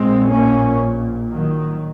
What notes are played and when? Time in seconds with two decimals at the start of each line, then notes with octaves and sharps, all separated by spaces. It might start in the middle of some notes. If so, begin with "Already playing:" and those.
Already playing: A#1 A#2 G#3 C4
0.29 A#3 C#4
1.29 D#3 F#3